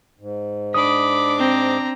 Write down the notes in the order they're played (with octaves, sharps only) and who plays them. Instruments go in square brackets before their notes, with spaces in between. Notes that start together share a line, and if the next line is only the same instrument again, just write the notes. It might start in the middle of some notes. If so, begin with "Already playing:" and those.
[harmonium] G#2
[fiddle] D4 D6 [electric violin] B5 [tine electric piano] D#6
[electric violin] C4 A#5